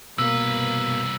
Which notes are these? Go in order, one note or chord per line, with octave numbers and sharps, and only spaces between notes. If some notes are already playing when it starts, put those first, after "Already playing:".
C2 B2 A#3 B4 E6